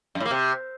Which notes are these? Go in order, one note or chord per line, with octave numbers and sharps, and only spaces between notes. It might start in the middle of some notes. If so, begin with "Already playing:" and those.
F#2
A2
A#3
C3